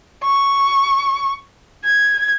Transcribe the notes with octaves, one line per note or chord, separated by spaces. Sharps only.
C#6
G#6